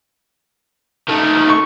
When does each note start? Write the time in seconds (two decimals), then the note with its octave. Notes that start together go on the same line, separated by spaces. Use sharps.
1.08 D#3 A3
1.49 C#6